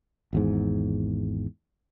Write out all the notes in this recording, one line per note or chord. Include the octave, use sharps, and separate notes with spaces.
G#1 E2 G#2